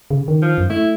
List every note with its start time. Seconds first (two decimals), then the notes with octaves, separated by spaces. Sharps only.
0.11 C#3
0.28 D#3
0.42 F3
0.58 F#2
0.70 A3 E4